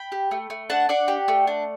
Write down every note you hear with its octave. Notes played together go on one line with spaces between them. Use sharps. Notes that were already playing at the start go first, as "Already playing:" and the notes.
Already playing: G5 B5
G4
A3
A3
D4 F#5 A5
D4 D5 F#5
G4
A3
D4